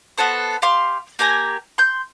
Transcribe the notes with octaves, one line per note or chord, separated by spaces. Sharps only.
B3 F#4 A4 C5
G4 F5 C6 F6
A#3 G4 G#5 A#5
C6 G6